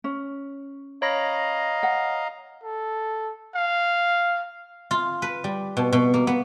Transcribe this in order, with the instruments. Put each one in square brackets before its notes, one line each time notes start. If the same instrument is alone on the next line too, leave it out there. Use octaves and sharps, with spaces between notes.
[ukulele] C#4
[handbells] C#5 B5 A#6 [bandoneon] D#5 F5 A#5
[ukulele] F#5
[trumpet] A4
F5
[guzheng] F4
B4
G3
B2
B2
A#3
B3